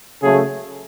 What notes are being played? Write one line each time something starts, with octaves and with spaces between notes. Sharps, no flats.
C#3 F#3 A3 G#4